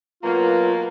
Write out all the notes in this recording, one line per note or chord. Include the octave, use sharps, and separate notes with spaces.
B2 F#3 A#3 F4 B4